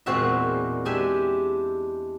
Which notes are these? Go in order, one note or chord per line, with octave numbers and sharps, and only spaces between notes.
E2 A#2 G#3 C4 F#4 E5
G#3 D4 G4 E5 G#5